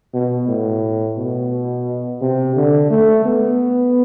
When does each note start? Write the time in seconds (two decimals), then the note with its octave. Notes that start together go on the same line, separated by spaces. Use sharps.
0.14 B2
0.48 A2
1.18 B2
2.22 C3
2.56 D3
2.91 A3
3.25 B3